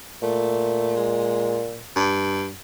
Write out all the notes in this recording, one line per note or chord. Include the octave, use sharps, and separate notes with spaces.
A#2 A3
G#3
G2